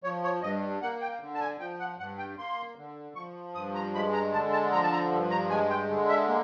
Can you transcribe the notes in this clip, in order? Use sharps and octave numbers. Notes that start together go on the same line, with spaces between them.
F3 C#5
C#5
G2 D#5
A#3 F#5
G5
D3
A5
G#5
F3 G5
F#5
G2 F#5
G5
A#3 C6
D3
F3 C#6
G2 D#6
A#5
G#3 B5
A#5
D3 A5
A5
F3 A#5
A5
A#5
G2
A#5
G#3 G#5
G5
D3
E5
A#3